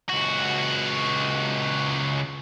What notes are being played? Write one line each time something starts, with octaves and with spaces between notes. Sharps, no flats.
C#2 F#4